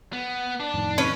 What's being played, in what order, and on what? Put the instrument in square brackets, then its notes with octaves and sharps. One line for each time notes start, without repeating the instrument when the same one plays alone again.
[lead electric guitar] B3
[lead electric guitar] D4 [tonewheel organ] D5
[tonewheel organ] F2 A2 D#3
[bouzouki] C#4 B4